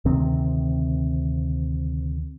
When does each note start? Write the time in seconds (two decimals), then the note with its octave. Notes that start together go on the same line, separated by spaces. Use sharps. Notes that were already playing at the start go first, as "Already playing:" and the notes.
0.05 D2 C3 D#3 C4